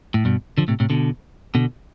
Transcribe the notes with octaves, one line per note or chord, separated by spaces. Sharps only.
A2
G2 B2
D3 F3
A2 C3
A2 C3
B2 D3
B2 D3